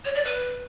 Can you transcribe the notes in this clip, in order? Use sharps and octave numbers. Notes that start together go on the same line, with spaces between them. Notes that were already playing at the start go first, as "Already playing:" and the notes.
C#5
D5
B4